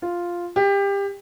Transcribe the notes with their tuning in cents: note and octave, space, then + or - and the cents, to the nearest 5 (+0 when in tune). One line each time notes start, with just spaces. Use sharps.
F4 +0
G4 +25